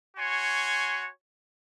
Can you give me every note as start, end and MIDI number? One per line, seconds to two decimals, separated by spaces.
0.17 1.09 66
0.17 1.09 73
0.17 1.09 80
0.17 1.09 84